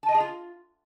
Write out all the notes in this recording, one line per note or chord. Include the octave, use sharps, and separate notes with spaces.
A5
D#5
G#4
F4